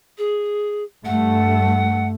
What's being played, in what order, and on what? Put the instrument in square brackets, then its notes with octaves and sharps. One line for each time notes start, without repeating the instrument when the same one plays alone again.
[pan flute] G#4
[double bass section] G2 A3 [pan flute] F#5